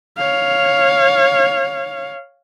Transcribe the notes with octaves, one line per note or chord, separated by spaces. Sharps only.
C#5 F5